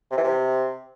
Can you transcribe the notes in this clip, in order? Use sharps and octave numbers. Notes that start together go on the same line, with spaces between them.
C3
E3
C3